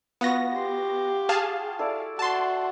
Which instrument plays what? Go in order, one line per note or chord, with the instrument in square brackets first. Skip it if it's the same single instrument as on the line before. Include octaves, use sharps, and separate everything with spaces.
[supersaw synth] B3 A#6 [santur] F4 F#4
[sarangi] G4 [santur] C6
[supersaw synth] G#4 F5 A5
[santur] E4 A4 D5
[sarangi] F#4 [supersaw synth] A5 C6